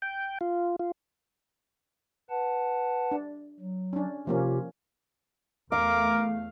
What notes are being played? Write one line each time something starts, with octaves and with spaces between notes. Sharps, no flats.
G5
F4
F4
B4 F#5 A5
D4
F#3
C#4 D4
C3 F3 A#3 C#4 F4 G4
E2 A3 A#4 F5 D6